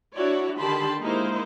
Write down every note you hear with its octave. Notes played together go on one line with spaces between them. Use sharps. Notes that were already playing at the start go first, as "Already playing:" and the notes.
D4 E4 F#4 C#5 D5
D3 D#3 G4 A5 B5 C6
G#3 A#3 D#4 E4 C5